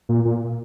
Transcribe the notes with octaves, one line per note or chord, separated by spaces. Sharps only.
A#2
A#2